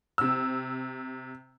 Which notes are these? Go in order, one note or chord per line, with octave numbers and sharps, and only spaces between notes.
C3 E6